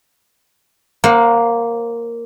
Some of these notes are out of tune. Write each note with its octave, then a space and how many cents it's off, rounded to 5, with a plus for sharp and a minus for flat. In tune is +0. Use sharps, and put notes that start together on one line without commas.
A#3 +0 C5 +35 F#5 -20